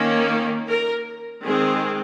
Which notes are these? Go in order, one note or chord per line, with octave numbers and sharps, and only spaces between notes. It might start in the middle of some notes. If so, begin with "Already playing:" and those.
Already playing: D#3 A#3 C#4
A#4
D#3 G#3 C4 G#4